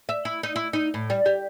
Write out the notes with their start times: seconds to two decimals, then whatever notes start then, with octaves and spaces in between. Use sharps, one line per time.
0.09 E5
0.25 E4
0.43 D#4
0.56 E4
0.73 D#4
0.94 A2
1.10 G3
1.26 G4